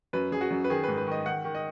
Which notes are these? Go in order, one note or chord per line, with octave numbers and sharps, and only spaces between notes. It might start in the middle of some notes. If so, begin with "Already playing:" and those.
F#2 B4
F#2 G#4
F#4
F#2
B4
D#3 G#4
G#2 B4
B4
D#3 D#5
D#3 F#5
D#3
D#5